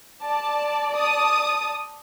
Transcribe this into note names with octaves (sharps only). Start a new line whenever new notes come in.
D5 A5
A5 D#6